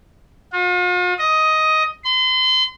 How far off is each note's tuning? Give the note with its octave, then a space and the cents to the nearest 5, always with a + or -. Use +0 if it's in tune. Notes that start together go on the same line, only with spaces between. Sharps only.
F4 +45
D#5 +10
C6 -35